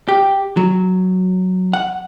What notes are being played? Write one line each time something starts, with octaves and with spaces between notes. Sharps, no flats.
G4
F#3
F#5